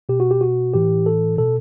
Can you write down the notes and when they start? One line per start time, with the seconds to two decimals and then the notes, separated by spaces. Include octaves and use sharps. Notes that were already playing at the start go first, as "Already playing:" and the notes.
0.09 B2 G4
0.20 F#4
0.31 G4
0.41 F#4
0.74 A2 E3 G4
1.06 A4
1.37 B2 A4